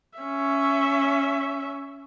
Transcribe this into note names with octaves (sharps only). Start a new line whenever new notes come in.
C#4 E5